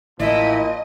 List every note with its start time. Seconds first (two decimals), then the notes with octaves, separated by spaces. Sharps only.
0.20 A1 A#2 F3 E4 D#5